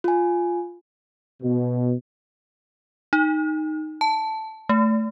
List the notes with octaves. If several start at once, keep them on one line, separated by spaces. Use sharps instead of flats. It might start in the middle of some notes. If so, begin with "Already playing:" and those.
F4 G#5
B2
D#4
A5
A3